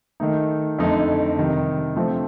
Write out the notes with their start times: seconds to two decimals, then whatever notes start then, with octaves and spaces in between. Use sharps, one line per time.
0.20 D#3 A3 D#4
0.79 F2 D3 A3 D#4 A4
1.37 C3 D#3 G3
1.96 D3 F3 A3 C4 F4